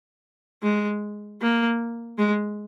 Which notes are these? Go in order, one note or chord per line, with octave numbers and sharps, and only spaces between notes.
G#3
A#3
G#3